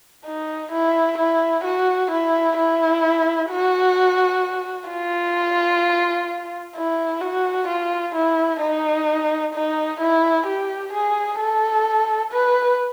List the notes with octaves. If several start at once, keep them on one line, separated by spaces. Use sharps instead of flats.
D#4
E4
E4
F#4
E4
E4
F#4
F4
E4
F#4
F4
E4
D#4
D#4
E4
G4
G#4
A4
B4